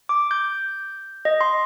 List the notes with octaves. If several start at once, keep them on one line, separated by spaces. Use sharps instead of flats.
D6
G6
D#5
C6